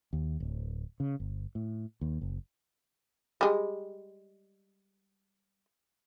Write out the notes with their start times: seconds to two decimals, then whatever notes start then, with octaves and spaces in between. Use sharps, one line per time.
0.13 D#2
0.40 D1
1.00 C#3
1.20 G1
1.55 A2
2.01 D#2
2.21 F#1
3.41 G3 G#3